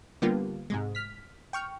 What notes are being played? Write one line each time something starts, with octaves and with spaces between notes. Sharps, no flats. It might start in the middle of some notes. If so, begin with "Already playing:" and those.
D3 G3 A#3 B3 F4 G4
G#2 C3 G#3
F6 B6
G5 C#6 F6